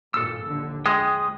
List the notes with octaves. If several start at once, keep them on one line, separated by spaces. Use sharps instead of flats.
G#1 G2 A#2 A4 E6
A#1 D#2 D3
F2 G#3 G5 D#6